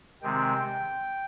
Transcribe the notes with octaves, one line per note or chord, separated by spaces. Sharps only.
C3 D#3 G#3 C4 G5